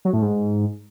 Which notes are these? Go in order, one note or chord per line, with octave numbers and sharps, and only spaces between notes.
F#3
A2
G#2